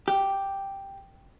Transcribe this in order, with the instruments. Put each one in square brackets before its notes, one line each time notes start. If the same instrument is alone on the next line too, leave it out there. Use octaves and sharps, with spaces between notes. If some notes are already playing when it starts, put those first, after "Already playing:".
[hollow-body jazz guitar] G4